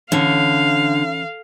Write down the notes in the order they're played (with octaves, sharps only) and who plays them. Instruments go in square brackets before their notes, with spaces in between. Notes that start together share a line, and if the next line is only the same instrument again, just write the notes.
[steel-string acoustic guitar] D3 [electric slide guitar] E3 C#4 C#5 [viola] F5